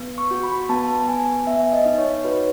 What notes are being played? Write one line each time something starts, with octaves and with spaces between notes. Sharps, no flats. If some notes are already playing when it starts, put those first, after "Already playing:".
Already playing: B3
C#6
F#4
B5
B3 A5
B3 G#5
B3 E5
D#5
D#4
C#5
F#4 B4